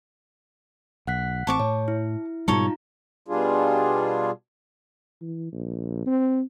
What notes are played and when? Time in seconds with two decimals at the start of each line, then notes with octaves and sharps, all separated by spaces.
1.07 B1 F#5 F#6 B6
1.47 A1 C4 A5 C#6 D6
1.60 A2 C#5
1.88 E4
2.48 G#2 B2 G3 D#4 F4 A4 C#5 A#5
3.28 B2 G3 D4 F4 G#4
5.21 E3
5.52 A#1
6.06 C4